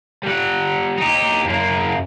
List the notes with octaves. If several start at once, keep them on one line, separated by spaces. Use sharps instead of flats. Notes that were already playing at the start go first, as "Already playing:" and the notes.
G3 F#5
D#4 G4
F#2 A#3